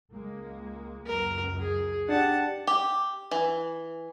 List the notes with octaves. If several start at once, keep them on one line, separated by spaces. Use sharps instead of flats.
C#2 G#3 A#3
C#2 F#2 A#4
G#4
D4 G4 F#5 A5
G4
E3